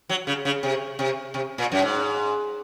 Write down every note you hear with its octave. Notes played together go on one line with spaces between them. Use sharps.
F#3
C#3
C#3
C3
C3
C3
A#2
F#2
G#2